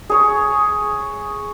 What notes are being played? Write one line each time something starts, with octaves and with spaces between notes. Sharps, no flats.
G#4 C#5